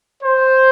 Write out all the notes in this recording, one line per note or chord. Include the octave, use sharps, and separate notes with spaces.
C5